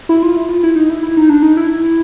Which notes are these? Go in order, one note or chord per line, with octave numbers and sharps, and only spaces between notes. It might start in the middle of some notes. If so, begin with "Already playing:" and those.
E4
F4
E4
F4
E4
D#4
E4
E4
D#4
D4
D#4
E4